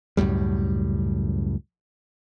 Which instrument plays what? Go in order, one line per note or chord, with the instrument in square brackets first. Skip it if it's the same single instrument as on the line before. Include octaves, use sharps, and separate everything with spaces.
[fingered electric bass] C#2 F#2 A2 G3